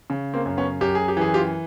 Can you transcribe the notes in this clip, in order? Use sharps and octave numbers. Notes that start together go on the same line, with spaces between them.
C#3
A#3 C4
F#2
B3 C#4
F#2 G4
G#4
G4
E3 G#4
F4 G4